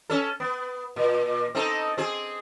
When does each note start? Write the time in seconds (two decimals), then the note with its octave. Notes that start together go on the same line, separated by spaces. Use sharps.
0.10 C#4 A4
0.40 B3
0.96 A#2
1.55 C4 D#4 A4
1.98 C4 G#4